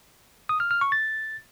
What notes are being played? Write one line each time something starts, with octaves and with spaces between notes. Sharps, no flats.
D#6
F6
F6
C#6
A6